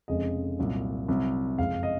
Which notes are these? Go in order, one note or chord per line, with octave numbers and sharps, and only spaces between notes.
F1 F2 C#3 G#3 D#5
C2 A#2 F#3
C2 C3 F#3
F#1 F2 C#3 G#3 F5
D#5